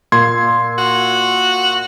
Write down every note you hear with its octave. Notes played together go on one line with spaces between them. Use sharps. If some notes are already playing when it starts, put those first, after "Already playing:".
A#2 C6 G#6
F#4